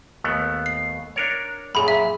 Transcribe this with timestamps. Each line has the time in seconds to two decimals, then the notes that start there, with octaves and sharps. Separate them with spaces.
0.24 D#2 A3 B3
0.66 C7
1.16 D4 A#4 C#5
1.75 F#2 A#2 G#4 B5
1.88 E5